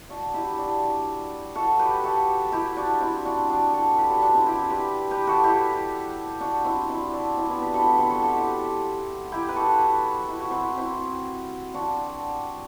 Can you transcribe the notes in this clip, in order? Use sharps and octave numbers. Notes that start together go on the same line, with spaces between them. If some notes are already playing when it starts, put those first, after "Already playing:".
D4 F#4
E4 G4
D4 F#4
F#4 A4
G4 B4
F#4 A4
E4 G4
D4 F#4
C4 E4
D4 F#4
D4 F#4
F#4 A4
G4 B4
F#4 A4
D4 F#4
C4 E4
E4 G4
G4 B4
G4 B4
F#4 A4
E4 G4
D4 F#4
C4 E4
C4 E4
D4 F#4
C4 E4
B3 D4
G4 B4
F#4 A4
E4 G4
C4 E4
F#4 A4
F#4 A4
E4 G4
E4 G4
B4
F#4 A4
E4
F#4
C4 E4
C4 E4
D4 F#4